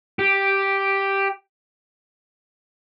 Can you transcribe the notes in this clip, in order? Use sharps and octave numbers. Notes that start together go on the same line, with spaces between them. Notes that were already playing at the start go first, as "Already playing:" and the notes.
G4